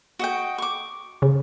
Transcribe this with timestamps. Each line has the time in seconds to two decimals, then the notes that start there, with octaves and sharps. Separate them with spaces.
0.19 F#4 D#5 G5
0.58 C#6 D6
1.22 C#3